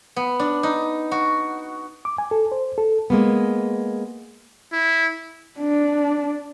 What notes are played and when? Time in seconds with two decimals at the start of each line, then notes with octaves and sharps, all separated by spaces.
0.16 B3
0.40 D4
0.63 D#4
1.11 F#4
2.05 D6
2.18 G#5
2.31 A4
2.52 C5
2.78 A4
3.10 G#3 A#3 B3
4.72 E4
5.60 D4